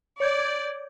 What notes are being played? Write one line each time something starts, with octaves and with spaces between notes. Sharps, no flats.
C#5 D5 G6 G#6